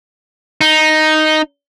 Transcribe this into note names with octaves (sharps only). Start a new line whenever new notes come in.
D#4